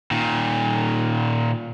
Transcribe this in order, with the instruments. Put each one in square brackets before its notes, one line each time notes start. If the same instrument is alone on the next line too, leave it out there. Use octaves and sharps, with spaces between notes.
[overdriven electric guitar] A#2 D#3